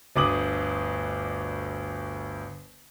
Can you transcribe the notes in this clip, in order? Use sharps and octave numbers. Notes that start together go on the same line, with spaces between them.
G1 D2 D6 D#6 F#7